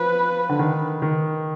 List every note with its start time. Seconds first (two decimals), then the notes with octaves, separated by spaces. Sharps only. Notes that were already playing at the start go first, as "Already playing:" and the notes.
Already playing: F3 B4
0.49 D3
0.59 D#3
1.02 D#3